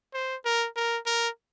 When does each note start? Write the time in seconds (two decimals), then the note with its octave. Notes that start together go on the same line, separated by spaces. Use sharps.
0.14 C5
0.45 A#4
0.76 A#4
1.06 A#4